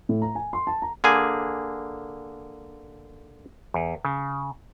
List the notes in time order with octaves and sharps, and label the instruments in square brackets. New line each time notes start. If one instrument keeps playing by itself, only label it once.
[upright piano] A2
A#5
G#5
C6
A5
A#5
[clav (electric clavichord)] D3 A#3 G#4 G#5
E2
C#3